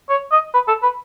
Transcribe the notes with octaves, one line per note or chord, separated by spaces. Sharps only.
C#5
D#5
B4
A4
B4